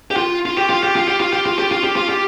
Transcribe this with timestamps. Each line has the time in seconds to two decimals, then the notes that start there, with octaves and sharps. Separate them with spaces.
0.11 G4
0.16 F4
0.45 F4
0.57 G4
0.69 F4
0.83 G4
0.96 F4
1.08 G4
1.20 F4
1.33 G4
1.46 F4
1.59 G4
1.71 F4
1.84 G4
1.96 F4
2.09 G4